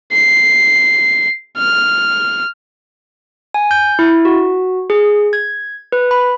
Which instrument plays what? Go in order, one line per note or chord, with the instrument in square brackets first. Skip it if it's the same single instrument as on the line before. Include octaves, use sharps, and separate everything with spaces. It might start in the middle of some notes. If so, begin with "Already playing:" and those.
[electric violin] C7
F6
[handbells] G#5
G6
E4
F#4
G#4
G#6
B4
B5